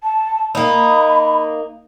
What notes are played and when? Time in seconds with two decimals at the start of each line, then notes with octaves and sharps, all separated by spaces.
0.03 A5
0.55 A#3 D#4 B5